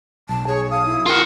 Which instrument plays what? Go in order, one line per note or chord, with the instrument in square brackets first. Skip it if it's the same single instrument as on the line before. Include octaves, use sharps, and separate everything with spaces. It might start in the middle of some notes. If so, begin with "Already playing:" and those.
[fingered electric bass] B1 [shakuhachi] A5
[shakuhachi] G#4 [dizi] C#5
[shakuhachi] F5 [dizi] D#6
[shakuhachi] E4
[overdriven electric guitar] F4 F#5 [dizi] A#4